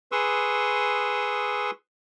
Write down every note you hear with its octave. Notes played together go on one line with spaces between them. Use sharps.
G#4 B4 C6 C#6 D#6 E6